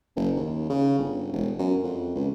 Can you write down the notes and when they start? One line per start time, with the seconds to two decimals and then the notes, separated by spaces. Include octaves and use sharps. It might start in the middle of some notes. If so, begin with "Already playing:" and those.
0.16 F#1
0.36 D#2
0.70 C#3
0.99 G1
1.33 E1
1.59 F#2
1.84 F2
2.15 C#2